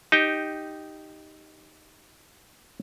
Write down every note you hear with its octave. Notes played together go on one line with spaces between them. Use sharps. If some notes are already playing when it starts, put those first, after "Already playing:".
D#4 G4 G5